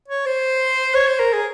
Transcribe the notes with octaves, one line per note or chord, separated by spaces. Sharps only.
C#5
C5
C#5
C5
A#4
G#4